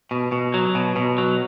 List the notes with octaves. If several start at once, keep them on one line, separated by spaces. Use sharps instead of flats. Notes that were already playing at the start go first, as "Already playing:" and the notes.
B2
B2
F#3
B2
B2
F#3